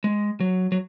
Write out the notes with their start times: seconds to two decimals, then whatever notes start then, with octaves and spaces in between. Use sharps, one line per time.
0.04 G#3
0.40 F#3
0.72 F#3